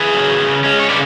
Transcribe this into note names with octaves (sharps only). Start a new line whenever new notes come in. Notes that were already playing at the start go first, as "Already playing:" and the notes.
Already playing: G#4 B4
C#3 F#3
C#3
G#3 C#4
C#5
C#3 B4 D5